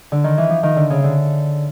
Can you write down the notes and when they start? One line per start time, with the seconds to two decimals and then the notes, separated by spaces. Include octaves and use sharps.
0.12 D3
0.24 D#3
0.38 E3
0.50 F3
0.63 D#3
0.76 D3
0.90 C#3
1.04 D3